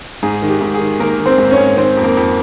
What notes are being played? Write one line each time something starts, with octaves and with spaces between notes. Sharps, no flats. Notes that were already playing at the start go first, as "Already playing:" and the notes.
G#2 G#4
D#3
G4
G#2
G#4
D#3
D#3 A#3 A#4
D#3
C4 C5
G#2
C5
C#4 C#5
G#2
D#3 C4 C5
F2
A#3 A#4
F2